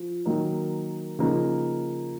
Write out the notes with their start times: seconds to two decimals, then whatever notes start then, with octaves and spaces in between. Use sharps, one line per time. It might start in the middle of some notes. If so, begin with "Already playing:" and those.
Already playing: F3
0.25 D#3 F#3 A#3 D#4
1.19 C#3 F3 A#3 D#4